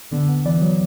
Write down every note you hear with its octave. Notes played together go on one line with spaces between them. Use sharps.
D3 B3
B3
E3 D5
F#3